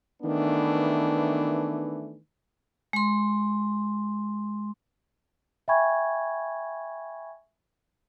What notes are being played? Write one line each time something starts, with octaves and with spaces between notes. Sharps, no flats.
D#3 E3 A3 B3 D4
G#3 C6
E5 G5 G#5 B5 C#6 G#6